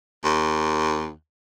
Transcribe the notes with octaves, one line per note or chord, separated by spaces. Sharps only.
D#2